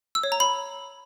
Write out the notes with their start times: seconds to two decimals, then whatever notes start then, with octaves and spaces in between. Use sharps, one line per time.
0.15 E6
0.23 C#5
0.32 A#5
0.40 B5